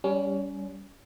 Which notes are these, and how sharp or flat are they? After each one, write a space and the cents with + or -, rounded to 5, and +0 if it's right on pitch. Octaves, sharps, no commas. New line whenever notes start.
G3 +0 C#4 +25